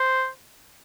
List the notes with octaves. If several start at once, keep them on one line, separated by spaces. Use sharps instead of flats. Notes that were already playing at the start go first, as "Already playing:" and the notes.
Already playing: C5